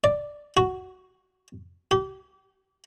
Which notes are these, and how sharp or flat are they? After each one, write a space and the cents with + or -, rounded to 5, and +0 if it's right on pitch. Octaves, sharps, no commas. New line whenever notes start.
D5 +5
F#4 +5
G4 -35